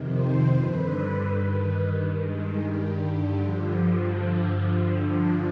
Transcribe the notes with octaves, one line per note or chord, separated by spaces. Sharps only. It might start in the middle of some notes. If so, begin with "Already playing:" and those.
Already playing: F2 C3 D#3
C5
G2 D3 B4
G2 D#3 B4
G2 D#3 G#3
G3
G2 D3
F3
G2 D3
G2 D3
F3